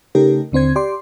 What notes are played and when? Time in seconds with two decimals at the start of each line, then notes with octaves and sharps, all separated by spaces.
0.15 C#3 A3 D#4 G4 A#4
0.52 D#2 D3 C4 C5 G#6
0.76 G4 D5 C6